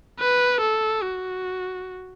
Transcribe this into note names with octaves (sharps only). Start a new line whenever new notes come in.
B4
A4
F#4